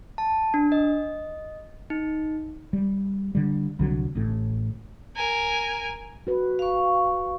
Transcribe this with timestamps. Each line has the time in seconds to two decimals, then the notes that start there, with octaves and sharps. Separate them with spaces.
0.18 A5
0.54 D4
0.72 D#5
1.90 D#4
2.73 G3
3.35 D3 G3
3.79 C2 D3 F#3
4.15 A1 A2
5.16 A#4 G#5
6.27 F#4 B4
6.59 F5 C#6